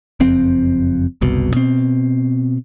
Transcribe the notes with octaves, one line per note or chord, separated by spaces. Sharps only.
F#1 F2 C4
F#1 C2 B2
B2 C4